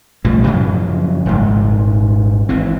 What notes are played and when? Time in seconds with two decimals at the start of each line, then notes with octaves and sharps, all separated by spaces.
0.25 B1 A2 F3 G3
0.46 F#2 C#3 F3 F#3
1.26 D#1 G#1 G#2
2.49 G#1 E3 C4